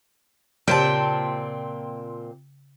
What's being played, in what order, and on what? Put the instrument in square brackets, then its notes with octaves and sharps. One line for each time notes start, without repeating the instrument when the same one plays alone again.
[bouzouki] A#2 C4 A5 [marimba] C#3 G4 [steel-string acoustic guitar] G5